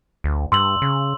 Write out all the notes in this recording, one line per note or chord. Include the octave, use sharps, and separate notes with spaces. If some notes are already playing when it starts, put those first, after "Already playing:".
D2
G2 C6 E6 F#7
C#3